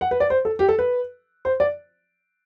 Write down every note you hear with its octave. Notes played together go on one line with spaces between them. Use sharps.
F#5
B4
D5
C5
A4
G4
A4
B4
C5
D5